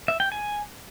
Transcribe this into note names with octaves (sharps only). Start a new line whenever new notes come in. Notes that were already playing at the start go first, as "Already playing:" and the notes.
E5
G5
G#5